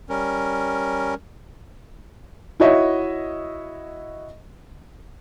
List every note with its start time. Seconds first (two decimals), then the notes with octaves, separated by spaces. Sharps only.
0.10 G3 C#4 A#4
2.60 E4 F#4 C#5 D#5 E5